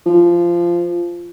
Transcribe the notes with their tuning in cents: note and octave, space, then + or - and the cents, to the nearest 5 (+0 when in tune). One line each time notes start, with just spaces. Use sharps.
F3 -15